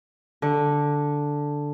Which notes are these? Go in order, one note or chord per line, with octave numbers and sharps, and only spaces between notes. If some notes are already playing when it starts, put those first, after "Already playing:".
D3